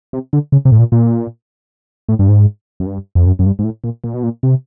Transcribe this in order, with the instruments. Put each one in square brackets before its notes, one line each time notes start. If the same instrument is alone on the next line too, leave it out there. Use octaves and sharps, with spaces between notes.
[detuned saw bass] C3
D3
C#3
C3
A2
A#2
A#2
A2
G2
G#2
F#2
G2
F2
F#2
F#2
G2
G#2
A2
A#2
A#2
B2
A#2
C3